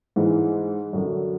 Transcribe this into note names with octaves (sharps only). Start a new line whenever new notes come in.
G#2 E3 G#3
F#2 D3 F#3